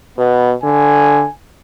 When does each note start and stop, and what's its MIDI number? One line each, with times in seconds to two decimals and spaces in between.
0.18 0.54 47
0.18 0.52 59
0.63 1.24 50
0.63 1.32 80